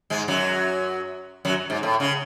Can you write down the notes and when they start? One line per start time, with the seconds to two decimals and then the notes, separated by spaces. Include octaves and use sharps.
0.10 G#2 G#3
0.28 F#2 F#3
1.45 F#2 F#3
1.70 G#2
1.83 A2
2.00 C#3